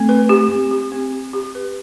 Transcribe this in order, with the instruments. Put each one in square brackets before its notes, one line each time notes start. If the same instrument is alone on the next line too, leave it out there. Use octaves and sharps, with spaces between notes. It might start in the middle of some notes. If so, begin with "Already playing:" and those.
Already playing: [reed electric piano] A3 [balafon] C4
[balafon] B4
G4
C4
G4
C4
G4
G4
B4